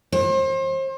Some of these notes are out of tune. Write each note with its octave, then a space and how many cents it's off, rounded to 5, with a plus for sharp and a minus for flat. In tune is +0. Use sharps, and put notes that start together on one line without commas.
C5 +35